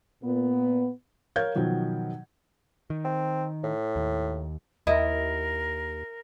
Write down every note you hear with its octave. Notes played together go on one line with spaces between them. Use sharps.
A#2 B3
A#4 C#5 F5 G6 G#6
B2 D#3 F3 F#3
D#3
C4
A2
D#2
D#2 E4 A#4 D#5